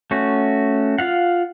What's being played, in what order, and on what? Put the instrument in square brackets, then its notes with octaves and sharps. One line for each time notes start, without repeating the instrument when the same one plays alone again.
[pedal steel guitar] A3 C#4 F#4
F4 F5 F#5